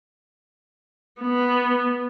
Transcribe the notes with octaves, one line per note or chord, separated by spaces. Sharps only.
B3